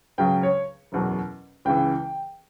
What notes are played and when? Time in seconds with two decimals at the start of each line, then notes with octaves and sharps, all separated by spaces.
0.18 C#2 C#3 F#3 G5
0.43 C#5
0.92 F#1 E2 B2 F#3
1.65 C#2 C#3 E3 G5